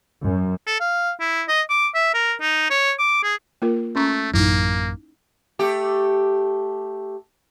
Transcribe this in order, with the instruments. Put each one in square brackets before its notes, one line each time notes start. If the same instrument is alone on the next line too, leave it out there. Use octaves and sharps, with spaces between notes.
[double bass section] F#2
[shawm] A4
F5
E4
D#5
D6
E5
A#4
D#4
C#5
D6
G#4
[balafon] A#3 F4 A#4
[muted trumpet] A3 [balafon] C#4 A#5 C#6
[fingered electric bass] A1 F#2 [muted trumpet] A#3 [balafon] D#4 E4
[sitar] A3 G4